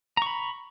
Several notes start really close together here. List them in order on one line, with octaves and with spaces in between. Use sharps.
A#5 C#6 B5